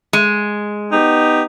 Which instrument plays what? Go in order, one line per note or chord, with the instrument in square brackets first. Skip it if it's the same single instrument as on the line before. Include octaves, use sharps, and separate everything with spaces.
[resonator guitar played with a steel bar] G#3
[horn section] B3 D#4 G4